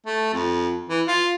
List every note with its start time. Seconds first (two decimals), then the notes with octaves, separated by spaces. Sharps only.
0.06 A3
0.34 F2
0.89 E3
1.08 F4